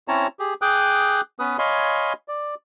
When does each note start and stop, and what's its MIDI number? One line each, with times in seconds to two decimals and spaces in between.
0.08 0.27 60
0.08 0.27 61
0.08 0.27 64
0.08 0.27 73
0.08 0.27 81
0.08 0.27 82
0.39 0.54 67
0.39 0.54 68
0.62 1.21 68
0.62 1.21 79
0.62 1.21 86
0.62 1.21 87
0.62 1.21 90
1.39 1.57 59
1.39 1.57 61
1.39 1.57 71
1.39 1.57 87
1.59 2.13 73
1.59 2.13 75
1.59 2.13 77
1.59 2.13 80
1.59 2.13 83
1.59 2.13 84
2.28 2.55 74